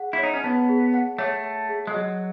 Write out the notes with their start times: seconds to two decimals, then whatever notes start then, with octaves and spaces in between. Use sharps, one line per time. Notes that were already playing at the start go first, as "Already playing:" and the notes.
Already playing: G#4 F#5
0.13 E4
0.18 C#5
0.23 D#4
0.34 C#4
0.44 B3 A5
0.69 G#4
0.94 F#5
1.18 A3 C#5
1.44 A5
1.69 G#4
1.87 G#3
1.94 F#3 D#5